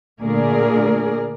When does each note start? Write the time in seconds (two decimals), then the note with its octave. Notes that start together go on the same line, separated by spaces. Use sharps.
0.21 A#2 D3 A3 G#4 A#4 D5